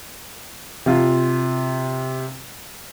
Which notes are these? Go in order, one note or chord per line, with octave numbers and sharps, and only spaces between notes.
C3 F4